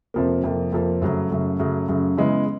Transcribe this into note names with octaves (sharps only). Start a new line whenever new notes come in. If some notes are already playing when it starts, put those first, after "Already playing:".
F2 C3 F3 A#3
F2 C3 F3 A#3
F2 C3 F3 A#3
F#2 C#3 F#3 A3
F#2 C#3 F#3 A3
F#2 C#3 F#3 A3
F#2 C#3 F#3 A3
C#3 E3 G#3 B3